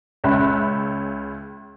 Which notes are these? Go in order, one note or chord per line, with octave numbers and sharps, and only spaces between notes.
C#2 C#4 E5 B5 F#6